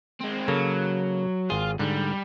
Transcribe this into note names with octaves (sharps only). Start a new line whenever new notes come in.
G#3 C4
C#3 F#3 A#3 A4
G#1 F4 G#4
G#2 D3 G3